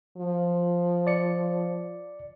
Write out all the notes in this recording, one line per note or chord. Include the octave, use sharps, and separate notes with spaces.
F3
D5 C#7